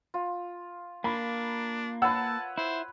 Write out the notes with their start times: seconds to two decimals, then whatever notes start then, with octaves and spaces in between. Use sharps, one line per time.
0.14 F4
1.04 A#3 D4 B5
2.02 B4 C#5 F#5 A5 E6
2.58 E4 C5